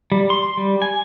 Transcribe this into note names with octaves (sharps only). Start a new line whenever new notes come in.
G3
C6
G3
G#5